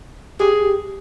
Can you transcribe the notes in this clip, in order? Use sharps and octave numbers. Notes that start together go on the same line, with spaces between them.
G4 G#4